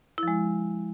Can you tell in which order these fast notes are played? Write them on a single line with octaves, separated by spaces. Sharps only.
E4 F3 G#3